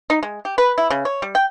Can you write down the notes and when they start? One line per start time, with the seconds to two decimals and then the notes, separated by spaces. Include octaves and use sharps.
0.10 D#4
0.23 G#3
0.45 G4
0.58 B4
0.78 E4
0.90 C#3
1.05 C#5
1.22 G3
1.35 G5